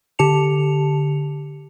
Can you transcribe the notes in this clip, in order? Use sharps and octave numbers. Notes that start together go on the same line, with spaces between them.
D3 G4 A5 C#7 F7